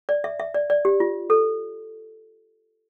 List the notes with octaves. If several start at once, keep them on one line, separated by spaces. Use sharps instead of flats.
D5
E5
E5
D5
D5
G4
F4
A4